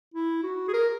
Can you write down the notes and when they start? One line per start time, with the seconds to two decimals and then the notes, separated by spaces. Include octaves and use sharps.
0.14 E4
0.43 F#4
0.68 G#4
0.74 A#4